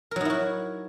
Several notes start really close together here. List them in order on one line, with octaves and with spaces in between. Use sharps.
A#4 F#3 D#4 E4 F#4